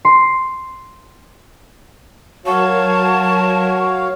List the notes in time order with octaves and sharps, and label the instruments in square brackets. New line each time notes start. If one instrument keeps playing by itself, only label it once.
[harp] C6
[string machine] F#3 A#4 G#6 [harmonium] F#4 C#5 F5 [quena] A5 [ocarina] C#6